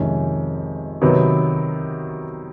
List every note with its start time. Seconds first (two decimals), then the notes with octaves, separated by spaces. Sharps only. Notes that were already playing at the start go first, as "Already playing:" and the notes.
Already playing: F2 C3 D#3 G#3 C#4
1.02 C3 D#3 F#3 B3